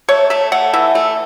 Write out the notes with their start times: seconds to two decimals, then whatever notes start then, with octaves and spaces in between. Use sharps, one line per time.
0.09 A3 C#5
0.30 A3 E5
0.52 A3 F#5
0.73 E3 E5
0.95 A3